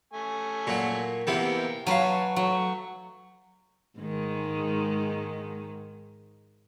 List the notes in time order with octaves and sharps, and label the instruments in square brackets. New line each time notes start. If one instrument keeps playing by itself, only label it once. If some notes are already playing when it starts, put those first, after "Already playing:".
[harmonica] A3 G#5 C#6
[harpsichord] A#2 F#3
[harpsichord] C3 E3 B3 [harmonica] A#3 G5
[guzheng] F#3 B4 [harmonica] C#5 A5 C#6 [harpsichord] F5 G#5
[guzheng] F#3 [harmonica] A3 C#6
[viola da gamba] G#2 D#3 G#3